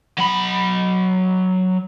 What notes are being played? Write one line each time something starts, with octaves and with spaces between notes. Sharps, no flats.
F#3 B5